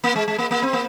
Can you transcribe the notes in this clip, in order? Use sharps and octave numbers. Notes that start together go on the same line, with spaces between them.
A#3
G#3
G#3
A#3
A#3
C4
A#3